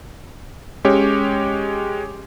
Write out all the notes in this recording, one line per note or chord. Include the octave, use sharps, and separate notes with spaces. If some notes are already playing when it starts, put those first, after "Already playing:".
G#3 C#4 G4 C#5